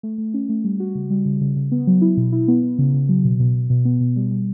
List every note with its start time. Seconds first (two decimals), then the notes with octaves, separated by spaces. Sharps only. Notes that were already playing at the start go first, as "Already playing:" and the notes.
0.03 A3
0.18 A3
0.34 C#4
0.49 A3
0.64 G3
0.80 F#4
0.95 C#3
1.10 G3
1.25 C#3
1.41 C#3
1.56 C#3
1.72 B3
1.87 F#3
2.02 E4
2.17 B2
2.32 E4
2.48 B3
2.63 B3
2.79 C#3
2.94 C#3
3.09 F#3
3.25 B2
3.40 B2
3.54 B2
3.70 B2
3.85 B3
4.01 B2
4.16 G3
4.31 G3